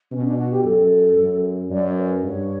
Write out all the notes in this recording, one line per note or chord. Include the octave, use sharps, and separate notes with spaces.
B2 C#4
D4
F#4
G4
F#2 A4
F#2
F#2 D5
C#5
B4
G2 C#5